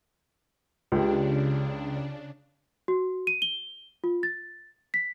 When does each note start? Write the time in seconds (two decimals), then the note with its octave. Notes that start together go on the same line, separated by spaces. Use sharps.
0.92 C#2 C#3 D4 G4
2.88 F#4
3.27 D#7
3.42 G7
4.04 F4
4.23 A6
4.94 B6